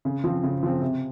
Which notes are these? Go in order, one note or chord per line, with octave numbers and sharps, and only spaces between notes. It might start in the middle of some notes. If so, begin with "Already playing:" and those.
C#3
F3 C4
C#3
F3 C4
C3